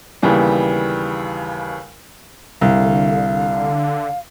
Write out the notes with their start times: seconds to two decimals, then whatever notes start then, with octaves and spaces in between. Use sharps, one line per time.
0.22 D#2 C#3 E3 G3 B3
2.61 C2 D3 F5